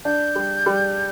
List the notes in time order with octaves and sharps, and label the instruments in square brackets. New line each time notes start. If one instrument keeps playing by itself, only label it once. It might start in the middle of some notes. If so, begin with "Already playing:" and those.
[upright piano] D4 [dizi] G6
[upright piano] G3
G3